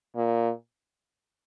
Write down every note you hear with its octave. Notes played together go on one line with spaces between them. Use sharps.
A#2